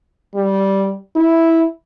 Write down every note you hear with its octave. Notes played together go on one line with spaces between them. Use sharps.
G3
E4